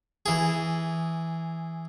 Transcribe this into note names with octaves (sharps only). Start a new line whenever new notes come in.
E3 G#4